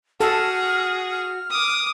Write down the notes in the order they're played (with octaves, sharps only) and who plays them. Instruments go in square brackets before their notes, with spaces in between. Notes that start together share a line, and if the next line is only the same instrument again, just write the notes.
[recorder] F#4 [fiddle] G#4 [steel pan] A4 [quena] F6
[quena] F6
[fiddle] D6 D#6